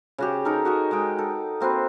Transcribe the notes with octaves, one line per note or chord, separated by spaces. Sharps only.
C#3 F#4 G4
D#4 A4 A#4
F#4 D#5 G#5
G#3 D#4 G5
A4
A#3 C4 F#4 B4